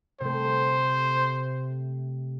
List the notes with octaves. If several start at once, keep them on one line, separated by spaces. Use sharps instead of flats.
C3 A3 C5